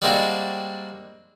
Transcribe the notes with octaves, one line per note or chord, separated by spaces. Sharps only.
G3 G#3 A#3 C4 D4 F#4